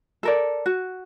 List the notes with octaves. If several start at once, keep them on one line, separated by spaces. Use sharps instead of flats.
A4 A#4 D5
F#4